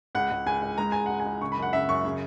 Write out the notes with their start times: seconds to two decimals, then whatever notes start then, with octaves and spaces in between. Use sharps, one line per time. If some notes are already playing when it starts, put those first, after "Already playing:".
0.15 C#2 F#5
0.31 C#2
0.46 C#2 G#5
0.62 C#2
0.78 G#3 A#5
0.92 C#2 G#5
1.06 C#2 F#5
1.20 G#5
1.26 C#2
1.41 C#3 C#6
1.52 B5
1.57 F#2
1.62 F#5
1.73 C#3 E5
1.89 F#2 C#6
2.05 C#3